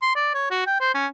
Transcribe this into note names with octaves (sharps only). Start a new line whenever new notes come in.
C6
D5
C#5
F#4
G5
C5
C#4